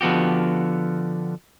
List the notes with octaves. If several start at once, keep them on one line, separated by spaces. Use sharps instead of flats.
D3 F3 B3 F#4 G4